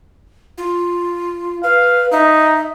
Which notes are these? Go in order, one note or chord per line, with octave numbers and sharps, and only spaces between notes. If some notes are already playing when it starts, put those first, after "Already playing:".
F4
B4 F5
D#4 E5